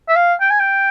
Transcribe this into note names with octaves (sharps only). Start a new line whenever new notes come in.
E5
F5
G5
G#5
G5